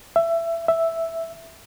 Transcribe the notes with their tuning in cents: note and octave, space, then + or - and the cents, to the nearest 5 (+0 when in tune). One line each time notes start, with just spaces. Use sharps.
E5 +20
E5 +0